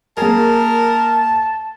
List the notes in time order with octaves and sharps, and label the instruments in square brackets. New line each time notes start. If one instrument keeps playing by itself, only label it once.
[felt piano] A#3 G#4 [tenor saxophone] A#4 [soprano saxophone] A5